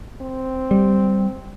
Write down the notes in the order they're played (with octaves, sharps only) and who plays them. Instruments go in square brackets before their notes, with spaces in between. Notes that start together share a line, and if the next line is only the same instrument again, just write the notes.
[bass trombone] C4
[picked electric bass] G3